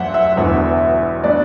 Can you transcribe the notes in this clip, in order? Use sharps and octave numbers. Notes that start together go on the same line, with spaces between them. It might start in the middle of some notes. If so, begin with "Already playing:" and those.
Already playing: F#2 F#3 A3 D4 C5 E5 F#5
E5
E1 E2 D3 F#3 B3
F#3 B3 D4 D5